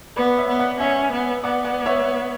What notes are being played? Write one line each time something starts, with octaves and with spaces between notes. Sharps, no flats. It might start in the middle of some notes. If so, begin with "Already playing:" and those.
B3 B4 D5
C#5 E5
B3
D5 F#5
C#4 E5 G#5
B3
B3 D5 F#5
D5 F#5
C#5 E5